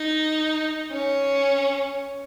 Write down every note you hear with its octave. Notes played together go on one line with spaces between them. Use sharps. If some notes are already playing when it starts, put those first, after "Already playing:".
Already playing: D#4
C#4